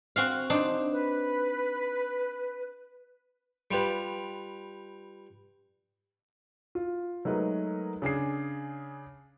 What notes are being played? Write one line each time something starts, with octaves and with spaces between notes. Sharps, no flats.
C4 F#4 F5
D4 D#4 C5
B4
G3 F4 G4 B4
F4
F#3 G#3 A3 D#4 A#4 B4
C#3 D4 G#4 C7